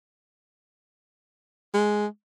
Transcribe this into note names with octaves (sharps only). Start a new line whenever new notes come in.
G#3